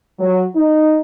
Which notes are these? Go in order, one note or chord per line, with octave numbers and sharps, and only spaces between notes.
F#3
D#4